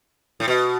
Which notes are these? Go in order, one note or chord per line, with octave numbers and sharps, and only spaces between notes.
A2
B2